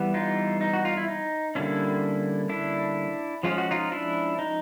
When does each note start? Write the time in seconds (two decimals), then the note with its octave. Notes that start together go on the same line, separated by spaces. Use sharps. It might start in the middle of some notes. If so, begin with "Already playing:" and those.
Already playing: E3 G3 B3
0.14 D#4 F4
0.61 D#4
0.73 F#4
0.85 F4
0.97 E4
1.08 D#4
1.55 D3 G3 A#3 C#4 D4 E4
2.49 D4 E4
3.43 F3 G#3 C#4 F4
3.58 F#4
3.71 D#4 F4
3.92 D4 E4
4.39 D#4